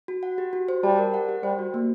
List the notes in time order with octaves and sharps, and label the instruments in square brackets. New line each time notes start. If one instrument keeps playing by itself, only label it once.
[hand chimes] F#4
F#5
G4
F#4
C5
[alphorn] G3 [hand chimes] A5
[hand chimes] A#4
F#5
G4
[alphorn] G3 [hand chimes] C5
[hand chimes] F#4
A#3